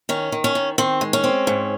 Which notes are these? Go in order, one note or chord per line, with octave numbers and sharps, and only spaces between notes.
D#3 C#4
D#3
C#4
D#3
D#3 C4
G#3
C#4
C4
G#2